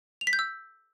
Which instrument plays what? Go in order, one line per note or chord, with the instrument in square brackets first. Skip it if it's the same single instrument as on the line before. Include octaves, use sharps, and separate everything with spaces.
[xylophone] F7
B6
G6
E6